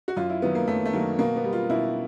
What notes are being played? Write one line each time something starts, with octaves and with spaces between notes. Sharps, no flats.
F#4
F#2 F4
E4
D#3 F#3 B3
A#3
F#2 A3
A3
D#3 F#3 A#3
B2 A#3
B3
G3
F4
B2 E4